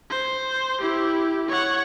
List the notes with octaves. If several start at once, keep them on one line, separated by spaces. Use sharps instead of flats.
C5
E4 G4
C#5 F#5